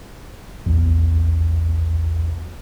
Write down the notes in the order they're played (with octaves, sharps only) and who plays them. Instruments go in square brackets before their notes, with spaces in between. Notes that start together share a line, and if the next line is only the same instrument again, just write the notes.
[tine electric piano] A#1 E2